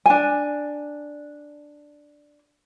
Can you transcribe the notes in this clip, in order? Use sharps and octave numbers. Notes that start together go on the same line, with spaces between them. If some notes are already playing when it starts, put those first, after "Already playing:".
D4 G#5